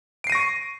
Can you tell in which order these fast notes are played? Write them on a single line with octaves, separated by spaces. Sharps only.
D7 C7 D#7 A#6 C#6